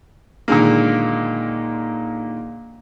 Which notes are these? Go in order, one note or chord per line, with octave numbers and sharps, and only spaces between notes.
A#2 D3 D#3 G#3 A#3